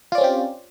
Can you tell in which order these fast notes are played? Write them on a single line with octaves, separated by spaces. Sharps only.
F4 D5 C#4 C4 G4